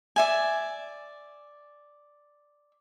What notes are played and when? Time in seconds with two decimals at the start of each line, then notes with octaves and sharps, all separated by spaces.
0.16 D5 E5 G#5